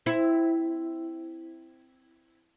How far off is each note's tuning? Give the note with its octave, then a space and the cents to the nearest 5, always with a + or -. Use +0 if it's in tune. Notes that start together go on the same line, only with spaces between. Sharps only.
C4 -10 E4 +0